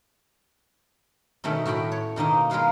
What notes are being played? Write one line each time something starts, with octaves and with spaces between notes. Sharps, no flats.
B2 D#3 A3 C#4
A2 F#4 G5 B5
C#5
B2 D#3 A#3 D#4
G#3 A#4 B4 F5 F#5